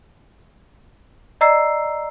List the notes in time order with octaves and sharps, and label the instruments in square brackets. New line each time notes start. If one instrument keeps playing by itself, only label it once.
[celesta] D5 D#5 A#5 E6 C7